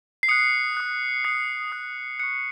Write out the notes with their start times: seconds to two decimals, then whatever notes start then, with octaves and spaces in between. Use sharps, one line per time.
0.23 C7
0.28 D#6 F#6 C#7
0.77 D#6 F#6
1.25 D#6 F#6 C7
1.72 D#6 F#6
2.19 C#6 F#6 C#7